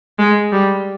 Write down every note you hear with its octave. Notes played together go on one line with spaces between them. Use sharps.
G#3
G3